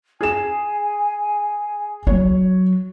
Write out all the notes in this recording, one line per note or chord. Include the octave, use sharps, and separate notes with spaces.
G#4 G#5 E7
F#3 C#5